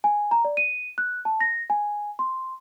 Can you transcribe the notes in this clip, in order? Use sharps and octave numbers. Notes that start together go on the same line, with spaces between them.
G#5
A#5
D5
D#7
F#6
A5
A#6
G#5
C6